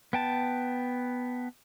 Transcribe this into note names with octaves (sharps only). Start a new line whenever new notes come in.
B3 G5 A5